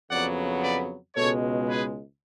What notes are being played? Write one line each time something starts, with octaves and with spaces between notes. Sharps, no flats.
F2 C#3 F#3 B3 D5 F#5
B4 D5
C#2 B2 G#3 A4 C#5
G#4 B4